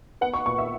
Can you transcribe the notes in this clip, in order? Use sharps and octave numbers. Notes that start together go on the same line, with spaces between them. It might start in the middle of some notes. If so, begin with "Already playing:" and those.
B3 F#5
C#6
A#2 C#6
E5